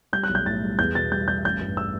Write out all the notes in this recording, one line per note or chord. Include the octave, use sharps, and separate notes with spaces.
G3 G6
F#6
B1
G6
A2 A6
G3
E2 G6
B2 A6
G3 G6
G3 G6
A1 G6
G2
E6